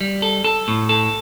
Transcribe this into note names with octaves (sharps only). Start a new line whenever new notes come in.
G3
A4
A4
A2
A4